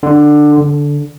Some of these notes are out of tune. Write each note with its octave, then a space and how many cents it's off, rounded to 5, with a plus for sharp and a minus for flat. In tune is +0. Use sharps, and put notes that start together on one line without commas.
D3 +15
D3 -10